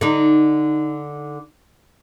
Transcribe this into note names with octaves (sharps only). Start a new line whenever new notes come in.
D3 D#4